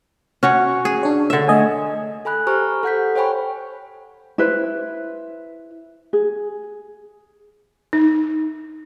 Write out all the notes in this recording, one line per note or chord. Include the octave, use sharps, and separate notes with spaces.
C#4 F#4 C#5
G#4
D4 C#5
D3 E5
A3 D#5 G#5
A4 G#5 B5 F#6
G4 C5 G#5 A#5 C#6 F6
A4 F#5 G6 B6
C5 C#5 G5 G#5 B5 C#6
E4 B4 C5
G#4
D#4